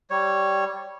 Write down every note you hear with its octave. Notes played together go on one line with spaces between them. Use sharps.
G3 C#5